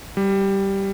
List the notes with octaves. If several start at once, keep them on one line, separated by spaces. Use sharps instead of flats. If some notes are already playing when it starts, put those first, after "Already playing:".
G3